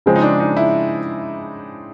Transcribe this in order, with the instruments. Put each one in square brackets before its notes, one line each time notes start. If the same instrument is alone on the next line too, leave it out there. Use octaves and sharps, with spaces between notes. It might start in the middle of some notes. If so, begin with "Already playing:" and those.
[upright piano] C#3 F3 G#3 [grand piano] C4
[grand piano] D#4
D4
D#4
E4